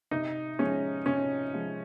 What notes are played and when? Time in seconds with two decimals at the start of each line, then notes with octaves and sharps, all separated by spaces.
0.11 C3 D#4
0.59 F3 G#3 C#4
1.06 C3 C#4
1.53 F3 G#3